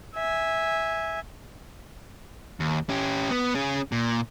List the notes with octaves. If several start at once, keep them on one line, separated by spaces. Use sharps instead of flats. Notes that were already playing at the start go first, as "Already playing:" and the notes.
E5 G#5
D#2
C#4 G4
B3
C#4 G#4
A#2